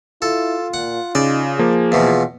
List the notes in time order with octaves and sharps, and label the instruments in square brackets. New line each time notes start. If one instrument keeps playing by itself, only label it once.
[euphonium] E4 [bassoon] F4 [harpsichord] A4
[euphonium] A#2 [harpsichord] F#5
[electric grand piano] C#3 [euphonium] D#4 [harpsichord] D5
[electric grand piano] F3 A#3 [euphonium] G#4
[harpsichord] E2 B2 [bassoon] F4